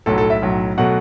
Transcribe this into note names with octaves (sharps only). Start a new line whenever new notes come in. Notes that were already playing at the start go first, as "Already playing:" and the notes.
B1 A2 F#3 A4
A4
E5
B1 A2 F#3
B2 F#3 A3 F#5